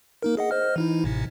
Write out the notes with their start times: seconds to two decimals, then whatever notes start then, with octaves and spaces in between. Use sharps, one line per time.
0.22 A#3 D#4 A#4
0.37 G#4 D#5 F#5
0.51 C5 D#5 F6
0.76 E3 D#4 E4
1.04 A1 A2 C3